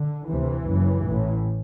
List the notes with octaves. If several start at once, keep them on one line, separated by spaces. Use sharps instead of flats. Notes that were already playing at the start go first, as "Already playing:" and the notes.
Already playing: D3
D2 C3 E3
F#1 F#2
A1 A2